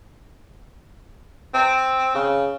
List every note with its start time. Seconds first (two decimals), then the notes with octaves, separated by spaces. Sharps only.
1.54 C4
2.15 C#3